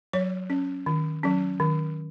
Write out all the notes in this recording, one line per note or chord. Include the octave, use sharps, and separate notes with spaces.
F#3 C#5
C#4
D#3
F#3 C#4
D#3